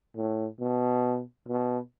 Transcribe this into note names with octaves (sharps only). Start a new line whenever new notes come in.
A2
B2
B2